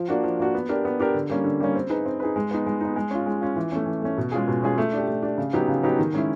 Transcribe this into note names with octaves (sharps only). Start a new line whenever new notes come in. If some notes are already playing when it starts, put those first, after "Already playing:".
Already playing: F3
A#3 D4 F#4
F3
A#3 D4 F#4
B3
D4 G4 A#4
B3
D4 G4 A#4
D3
G3 A#3 C#4
D3
G3 A#3 C#4
C4
D#4 G#4 B4
C4
D#4 G#4 B4
G#3
B3 D#4
G#3
B3 D#4
G#3
C#4 F4
G#3
C#4 F4
E3
A3 C#4
E3
A3 C#4
B2
G#3 C#4 F4 G#4
B2
G#3 C#4 F4 G#4
A3
D4 G4
A3
D4 G4
C#3
F#3 B3 D#4 G4
C#3
F#3 B3 D#4 G4
D#3
G#3 C#4 E4